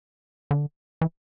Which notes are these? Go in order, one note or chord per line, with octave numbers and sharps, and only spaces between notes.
D3
E3